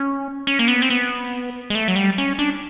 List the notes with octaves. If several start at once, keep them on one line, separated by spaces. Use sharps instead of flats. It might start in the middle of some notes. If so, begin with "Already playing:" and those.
Already playing: C#4
C#4
A#3
B3
C4
B3
G#3
A3
F#3
G3
C#4
D4